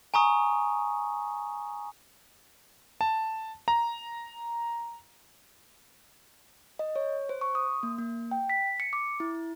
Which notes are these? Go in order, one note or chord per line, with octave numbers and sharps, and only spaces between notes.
G#5 A#5 C#6 D#6
A5
A#5
D#5
C#5
C5
C#6
D#6
A#3
A#3
G5
B6
C#7
D6
E4